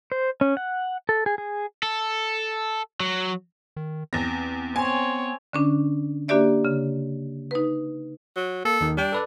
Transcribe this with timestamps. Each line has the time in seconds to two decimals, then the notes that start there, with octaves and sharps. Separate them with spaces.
0.12 C5
0.41 C#4
0.57 F#5
1.09 A4
1.26 G#4
1.38 G#4
1.83 A4
3.00 F#3
3.77 D#3
4.13 E2 C4 A#6
4.76 B3 C4 C#5 G#5
5.53 D3 C#4 D4
6.28 A#3 D4 F#4 G4 D5 E5
6.65 C#3
7.51 D#4 B4
8.36 F#3
8.65 A#3 A4
8.81 D#2 D#3
8.97 G3 D4 G5
9.12 A4 B4 D5